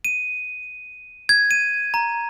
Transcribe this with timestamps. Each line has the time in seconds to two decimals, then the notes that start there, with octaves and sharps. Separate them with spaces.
0.05 D#7
1.29 G#6
1.51 D#7
1.94 A#5